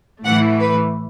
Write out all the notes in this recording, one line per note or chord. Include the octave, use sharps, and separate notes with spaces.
A2 E3 A3 F#5
B4